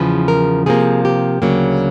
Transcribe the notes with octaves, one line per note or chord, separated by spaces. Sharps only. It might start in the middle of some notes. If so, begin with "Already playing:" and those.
Already playing: E2 C#3 F3 B4
A#4
C3 F3 A#3 G#4
G4
D2 C#3 F#3 A#3